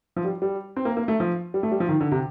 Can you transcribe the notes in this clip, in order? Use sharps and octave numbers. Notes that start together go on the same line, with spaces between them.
F3
G3
G3
C4
A#3
A#3
A3
F3
G3
A3
G3
F3
D#3
D3
C3